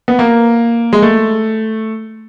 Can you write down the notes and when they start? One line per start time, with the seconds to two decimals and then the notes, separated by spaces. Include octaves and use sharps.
0.08 B3
0.19 A#3
0.93 G#3
1.02 A3